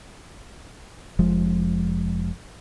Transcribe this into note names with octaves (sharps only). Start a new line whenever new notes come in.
F1 F3 G#3